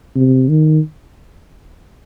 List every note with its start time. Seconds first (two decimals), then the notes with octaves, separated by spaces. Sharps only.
0.15 C3
0.49 D#3